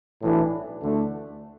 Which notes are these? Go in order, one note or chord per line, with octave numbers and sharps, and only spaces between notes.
B1 A2 E3 D4
D2 D3 A3 D4